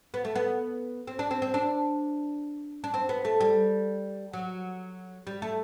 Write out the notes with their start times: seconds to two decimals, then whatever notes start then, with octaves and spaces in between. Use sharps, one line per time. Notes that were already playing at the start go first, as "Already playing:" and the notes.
0.14 B3
0.25 A3
0.35 B3
1.07 C4
1.19 D4
1.31 C4
1.42 C4
1.54 D4
2.84 D4
2.94 C4
3.09 B3
3.25 A3
3.40 G3
4.33 F#3
5.27 G3
5.42 A3